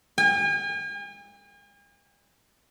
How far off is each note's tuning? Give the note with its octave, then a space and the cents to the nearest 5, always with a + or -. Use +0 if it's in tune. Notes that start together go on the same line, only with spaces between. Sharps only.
G#5 -45